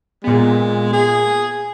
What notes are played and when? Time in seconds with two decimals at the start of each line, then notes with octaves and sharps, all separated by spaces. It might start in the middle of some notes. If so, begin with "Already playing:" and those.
0.24 A#2 G#3 B3
0.92 G#4